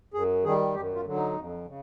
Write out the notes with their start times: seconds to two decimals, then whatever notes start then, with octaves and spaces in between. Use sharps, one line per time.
0.14 F#2 G#4
0.44 D#3 G3 G#4
0.75 F#2 G4
0.95 F4
1.05 D3 F#3
1.15 D#4
1.36 F2
1.67 C#3